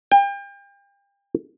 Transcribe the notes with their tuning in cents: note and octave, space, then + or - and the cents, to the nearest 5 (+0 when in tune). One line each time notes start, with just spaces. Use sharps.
G5 +35